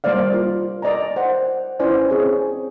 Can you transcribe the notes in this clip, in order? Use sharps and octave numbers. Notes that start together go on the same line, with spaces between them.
G3 A#3 C5 D5 F5
F4 A#4
A#4 D5 D#5 G#5 A#5
C5 F#5
C#4 E4 B4 C5 D5 G#5
C4 G#4 C#5